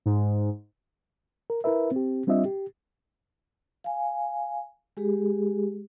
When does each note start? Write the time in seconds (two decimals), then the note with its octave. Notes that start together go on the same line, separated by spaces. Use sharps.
0.06 G#2
1.50 A#4
1.64 E4 A#4 B4 E5
1.91 C4 G4
2.27 G3 C4 D4 F4 D#5 E5
2.45 G4
3.84 F5 G#5
4.97 G#3 G4 G#4